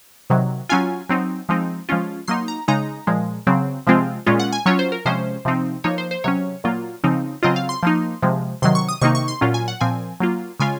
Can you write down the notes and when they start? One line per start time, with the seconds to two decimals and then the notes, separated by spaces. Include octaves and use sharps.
0.30 C3 D#3 F#3
0.69 F#3 C#4 F4 G#5
1.09 F#3 C4 D#4
1.49 F3 G#3 C4 D#4
1.89 F3 G#3 C#4 F4
2.28 F#3 A#3 D#4 C6
2.48 A#5
2.68 C#3 G#3 D#4 A#5
3.07 A#2 F3 G#3
3.47 C#3 F#3 C4
3.87 C3 F3 G#3 C4 F4
4.27 A#2 G#3 C#4 F4
4.39 F#5
4.52 G#5
4.66 F#3 C#4 F4 C#5
4.79 C5
4.92 A#4
5.05 C3 F3 G#3 C#4 C5
5.45 C3 F3 C4 D#4
5.84 F3 A#3 D#4 C#5
5.98 C5
6.11 C5
6.24 C3 F#3 C#4 C#5
6.64 A#2 F#3 A#3 F4
7.04 C#3 F3 C4 D#4
7.43 C#3 F#3 C4 F4 D#5
7.56 F5
7.69 C6
7.83 F3 A#3 D#4
8.23 C3 F3 G#3
8.62 C3 D#3 F#3 C6
8.75 C#6
8.89 D#6
9.01 C3 D#3 A#3 D#4 C#6
9.15 C#6
9.28 C6
9.41 A#2 F#3 C#4 F4
9.54 G#5
9.68 F#5
9.81 A#2 F3 C4 G#5
10.20 F#3 A#3 F4
10.60 C#3 G#3 C#4 F4 G#5